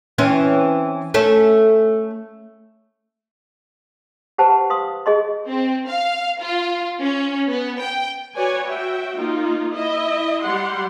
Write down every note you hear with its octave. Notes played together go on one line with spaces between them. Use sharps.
E3 C4 C#4
A3 C#4 A4
G4 B4 C5 F#5 A5
B4 F5 C6 D#6
G#4 D#5 C6
C4
F5
F4
C#4
B3
G5
F#4 B4 C#5 D5 G#5
F#4 E5 G5
A#3 D#4 F4
E4 D#5 E5
G3 G4 F#5 C6